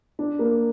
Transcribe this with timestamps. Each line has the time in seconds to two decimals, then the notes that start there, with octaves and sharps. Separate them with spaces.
0.19 D4
0.39 A#3